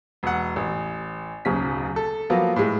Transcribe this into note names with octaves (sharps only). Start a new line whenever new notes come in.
E1 F#5
A1
D1 B1 C#3 B6
A4
F3 F#3 A#3 B3
A2 G#3